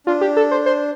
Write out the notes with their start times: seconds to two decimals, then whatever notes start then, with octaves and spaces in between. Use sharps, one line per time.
0.07 D4 F4
0.21 G4
0.37 A4
0.51 C5
0.66 C5